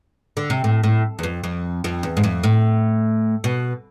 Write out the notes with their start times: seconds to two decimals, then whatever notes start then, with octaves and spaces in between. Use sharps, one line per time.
0.37 D3
0.50 C3
0.64 A2
0.83 A2
1.19 E2
1.23 F2
1.44 F2
1.84 F2
2.03 E2
2.17 G#2
2.24 F2
2.44 A2
3.44 B2